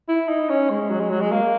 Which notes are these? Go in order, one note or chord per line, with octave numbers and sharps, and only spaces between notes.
E4
D#4
C#4
G#3
F#3
G#3
F#3
G#3
A#3